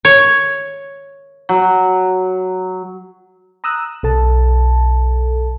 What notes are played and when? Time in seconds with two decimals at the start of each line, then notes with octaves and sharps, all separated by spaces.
0.05 C#5
1.49 F#3
3.64 A#5 D#6 E6 F#6
4.03 B1 A4 A5